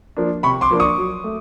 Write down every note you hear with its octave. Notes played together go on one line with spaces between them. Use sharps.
F3 A#3 D4
C3 B5 C#6
C6 D6
F3 A#3 D4
C#6 D#6
F#3
A3